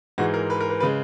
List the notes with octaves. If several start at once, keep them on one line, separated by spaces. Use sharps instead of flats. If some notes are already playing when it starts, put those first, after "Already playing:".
G#2 E3 G#3 F#4
A#4
B4
A#4
B4
C#3 G#3 B4